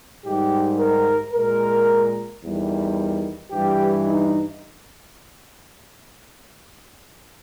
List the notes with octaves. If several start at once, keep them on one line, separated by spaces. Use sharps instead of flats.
G#2 D#3 G3 G4
A#4
A#2 G#3 A#4
E2 D#3 G3
G2 E3 G3 G4
D#4